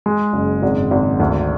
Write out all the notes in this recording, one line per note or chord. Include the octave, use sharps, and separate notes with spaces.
G#3
F#1
G#1
G#1
D2